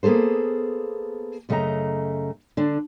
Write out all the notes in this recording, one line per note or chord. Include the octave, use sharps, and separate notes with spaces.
A#3 B3 G#4 A4 C5
F#2 C#3 A3 G4 D#5 A#5
D3 D4